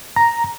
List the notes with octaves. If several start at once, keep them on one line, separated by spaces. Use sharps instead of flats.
A#5